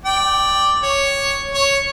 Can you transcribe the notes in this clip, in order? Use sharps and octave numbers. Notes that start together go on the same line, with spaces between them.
D5 G5
C#5
C#5